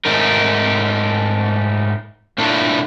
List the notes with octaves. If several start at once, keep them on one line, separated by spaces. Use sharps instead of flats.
G#2 A3 D#4 A#4
A#2 A3 D4 E4